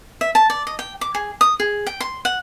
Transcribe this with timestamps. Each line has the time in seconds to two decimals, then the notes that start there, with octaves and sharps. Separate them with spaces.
0.21 E5
0.35 A5
0.50 D5
0.67 D#5
0.79 G5
1.01 D6
1.15 G#4
1.41 D#6
1.60 G#4
1.87 G5
2.00 C6
2.25 F#5